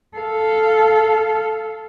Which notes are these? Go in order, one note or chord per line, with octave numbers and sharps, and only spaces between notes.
A4 F5